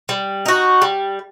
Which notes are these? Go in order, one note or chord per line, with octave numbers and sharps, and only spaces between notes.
G3
D#4 F#4
G3